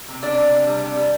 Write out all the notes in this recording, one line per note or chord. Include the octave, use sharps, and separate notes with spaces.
C3
C3 D4 D5
C3
C3
G3
C3
G3